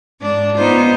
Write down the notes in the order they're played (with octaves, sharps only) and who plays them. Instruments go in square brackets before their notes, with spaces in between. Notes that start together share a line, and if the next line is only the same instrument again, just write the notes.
[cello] G#2 [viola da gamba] D4
[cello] B3 D#4 [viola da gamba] F4 C5